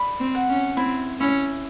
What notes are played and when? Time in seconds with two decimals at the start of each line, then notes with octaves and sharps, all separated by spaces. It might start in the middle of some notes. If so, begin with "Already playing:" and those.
Already playing: D5 B5
0.20 C4
0.35 F#5
0.49 C#4
0.77 C4 E4
1.20 C#4 E4